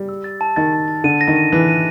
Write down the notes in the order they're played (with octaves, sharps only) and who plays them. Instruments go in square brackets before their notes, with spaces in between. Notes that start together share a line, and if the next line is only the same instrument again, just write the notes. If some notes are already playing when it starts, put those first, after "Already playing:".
Already playing: [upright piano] G3
[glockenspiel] E6
A6
A5
[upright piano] D#3 [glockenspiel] A6
[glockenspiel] A5
A6
[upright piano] D3 [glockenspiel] D#7
[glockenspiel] A#6
[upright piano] D#3
[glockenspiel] D#7
[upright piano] E3 [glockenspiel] F#6
[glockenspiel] D#7